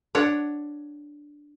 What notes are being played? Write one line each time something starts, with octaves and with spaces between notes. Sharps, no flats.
D4 C#5 F#5